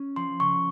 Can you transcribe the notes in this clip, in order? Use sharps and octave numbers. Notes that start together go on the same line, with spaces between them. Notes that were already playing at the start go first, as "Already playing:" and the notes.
Already playing: C#4
F3 C6
C#3 C#6